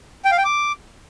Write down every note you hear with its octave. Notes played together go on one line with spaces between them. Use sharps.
G5
F5
G5
D6